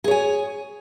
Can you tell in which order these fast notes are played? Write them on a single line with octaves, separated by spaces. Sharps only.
G#4 C#5 G#5